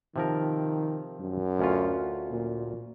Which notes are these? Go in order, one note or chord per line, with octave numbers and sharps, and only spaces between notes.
C3 D#3 F3 A#4
F#2
D2 C#4 F4
A#2